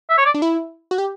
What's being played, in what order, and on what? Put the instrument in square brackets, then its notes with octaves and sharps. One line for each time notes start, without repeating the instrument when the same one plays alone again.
[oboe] E5
C#5
D5
[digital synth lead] D4
E4
F#4
G4